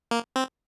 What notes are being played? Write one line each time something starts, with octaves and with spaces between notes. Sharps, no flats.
A#3
C4